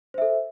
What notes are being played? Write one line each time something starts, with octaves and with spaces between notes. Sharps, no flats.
A4 C5 E5